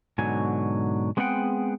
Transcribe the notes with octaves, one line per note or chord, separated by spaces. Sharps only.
G#2 B2 D3 F#3 G#5
G#3 B3 C4 G#4 F#5 G5